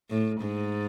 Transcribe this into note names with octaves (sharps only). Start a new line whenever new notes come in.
A2
G#2